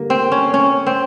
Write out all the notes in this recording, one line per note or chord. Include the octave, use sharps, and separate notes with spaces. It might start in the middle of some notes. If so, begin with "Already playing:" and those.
Already playing: G2 D3 A#3
C4
C#4
C#4
C4